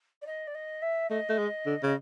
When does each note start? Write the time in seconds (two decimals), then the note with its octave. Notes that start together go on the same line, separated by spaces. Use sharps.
0.22 D5
0.27 D#5
0.47 D5
0.55 D#5
0.82 E5
1.10 A3 D#5
1.29 A3
1.38 G#3
1.66 D3
1.83 C#3 D#5